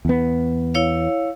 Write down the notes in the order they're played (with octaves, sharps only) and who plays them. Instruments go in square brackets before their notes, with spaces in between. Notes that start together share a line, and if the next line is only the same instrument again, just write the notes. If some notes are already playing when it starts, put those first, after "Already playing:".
[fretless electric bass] E2 B3
[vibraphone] E4 C#5 F5